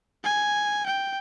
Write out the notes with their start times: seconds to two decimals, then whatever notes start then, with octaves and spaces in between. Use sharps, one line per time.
0.24 G#5
0.86 G5